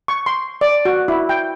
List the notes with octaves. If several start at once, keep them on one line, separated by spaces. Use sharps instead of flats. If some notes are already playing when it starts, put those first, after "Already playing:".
C#6
C6
D5
F#4
E4
G5